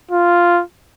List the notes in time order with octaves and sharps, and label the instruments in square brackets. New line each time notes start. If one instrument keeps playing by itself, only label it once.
[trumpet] F4